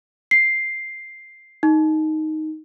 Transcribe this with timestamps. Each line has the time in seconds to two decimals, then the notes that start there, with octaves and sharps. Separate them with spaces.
0.31 C7
1.63 D#4